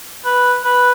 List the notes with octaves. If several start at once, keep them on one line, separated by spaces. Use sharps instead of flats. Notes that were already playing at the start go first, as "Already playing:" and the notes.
B4
B4